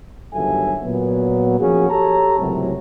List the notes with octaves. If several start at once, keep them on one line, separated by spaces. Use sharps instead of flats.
G1 D#2 F#3 A4 E5 G#5
A#2 F#3 B3
F3 A#3 C#4 F#4 G#4
G4 A4 C#5 A5 A#5
C#2 F#2 A2 C3 F#3